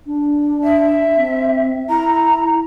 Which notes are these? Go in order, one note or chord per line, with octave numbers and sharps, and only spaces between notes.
D4
E5
C4
E4 A#5